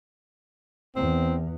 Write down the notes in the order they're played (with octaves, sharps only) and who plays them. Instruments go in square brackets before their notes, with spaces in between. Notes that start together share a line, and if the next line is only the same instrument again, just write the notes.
[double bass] E2 [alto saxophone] C4